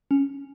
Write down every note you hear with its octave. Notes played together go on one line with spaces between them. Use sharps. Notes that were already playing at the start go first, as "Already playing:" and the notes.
C#4